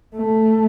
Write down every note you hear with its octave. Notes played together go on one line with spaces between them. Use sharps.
A3